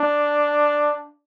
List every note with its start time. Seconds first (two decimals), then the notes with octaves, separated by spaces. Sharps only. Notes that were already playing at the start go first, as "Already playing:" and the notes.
Already playing: D4